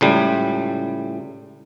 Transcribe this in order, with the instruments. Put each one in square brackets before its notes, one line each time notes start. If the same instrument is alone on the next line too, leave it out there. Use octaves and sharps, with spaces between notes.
[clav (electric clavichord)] C#2 A2 G3